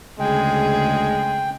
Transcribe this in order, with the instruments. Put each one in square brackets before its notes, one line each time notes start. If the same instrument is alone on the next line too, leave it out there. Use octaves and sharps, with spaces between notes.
[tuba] D2 [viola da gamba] C#3 G#4 [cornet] G#3 [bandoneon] G5